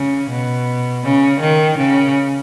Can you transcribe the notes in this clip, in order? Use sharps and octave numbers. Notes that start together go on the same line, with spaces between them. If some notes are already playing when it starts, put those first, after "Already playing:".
Already playing: C#3
B2
C#3
D#3
C#3